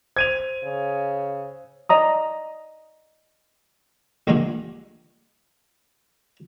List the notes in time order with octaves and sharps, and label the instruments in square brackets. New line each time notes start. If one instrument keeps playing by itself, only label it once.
[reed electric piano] C5 [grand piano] G#6 D#7 F7
[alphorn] C#3
[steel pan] D5 D#5 A#5 D#6
[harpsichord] A#1 G2 A#2 D3 G#3